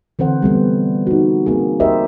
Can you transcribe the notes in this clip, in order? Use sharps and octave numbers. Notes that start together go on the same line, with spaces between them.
D3 E3 C4 C5 F#5
G3 A3 B3
D#4 F#4
A#3 C4 G#4
G4 A#4 C5 D#5 E5